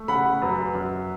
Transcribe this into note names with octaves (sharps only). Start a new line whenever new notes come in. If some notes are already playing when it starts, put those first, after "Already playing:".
Already playing: A3
C#3 F#5 B5
F#2 B4
F#2